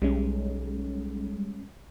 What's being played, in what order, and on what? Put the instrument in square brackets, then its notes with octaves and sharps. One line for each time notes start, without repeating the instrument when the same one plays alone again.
[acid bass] B1 [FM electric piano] G3 G#3 C#4